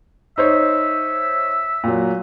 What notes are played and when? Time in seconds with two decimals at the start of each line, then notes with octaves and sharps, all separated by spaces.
0.38 D#4 C5 C#5 E5
1.84 A#2 F#3